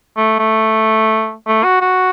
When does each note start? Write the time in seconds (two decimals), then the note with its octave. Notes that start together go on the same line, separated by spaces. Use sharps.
0.17 A3
0.39 A3
1.47 A3
1.64 F#4
1.81 F#4